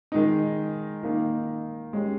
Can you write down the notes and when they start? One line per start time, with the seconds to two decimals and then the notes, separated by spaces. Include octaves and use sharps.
0.12 D#3 G#3 D#4
1.03 D#3 A#3 D#4
1.93 G#3 C#4 G4